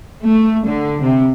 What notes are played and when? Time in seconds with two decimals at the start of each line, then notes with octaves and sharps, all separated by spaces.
0.23 A3
0.66 D3
0.99 C3